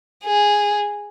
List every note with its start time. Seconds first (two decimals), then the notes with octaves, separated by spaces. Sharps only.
0.25 G#4